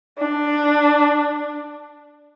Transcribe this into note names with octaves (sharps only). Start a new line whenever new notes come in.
D4